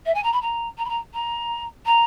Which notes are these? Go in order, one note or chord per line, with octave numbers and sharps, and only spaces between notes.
E5
G#5
A#5
B5
A#5
A#5
B5
A#5
A#5
A#5